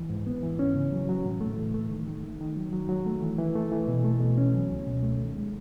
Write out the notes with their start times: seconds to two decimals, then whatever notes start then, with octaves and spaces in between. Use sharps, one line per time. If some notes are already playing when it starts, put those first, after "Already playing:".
Already playing: E3
0.09 G#2
0.27 B3
0.43 E3
0.59 C#4
0.75 C#3
0.92 F#3
1.09 F#3
1.24 A2
1.41 A3
1.57 E3
1.74 A3
1.91 D#3
2.07 D#3
2.24 A3
2.41 D#3
2.57 F#3
2.73 F#3
2.89 F#3
3.06 A3
3.23 E3
3.38 E3
3.55 A3
3.72 E3
3.88 B2
4.05 A3
4.21 B2
4.38 C#4
4.54 F#3
4.71 C#2
4.86 B2
5.03 A3
5.20 D#3
5.36 G#3